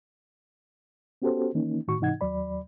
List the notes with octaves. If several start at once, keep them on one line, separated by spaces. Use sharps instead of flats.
B3 C#4 F#4 G4 A4 C5
D#3 E3 A#3 C#4 D#4
A2 D#3 F#4 C#6
G#2 C3 E3 D#4 F#5 G#6
D#2 F#3 D5 B5